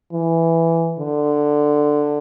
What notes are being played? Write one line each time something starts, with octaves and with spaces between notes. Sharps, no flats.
E3
D3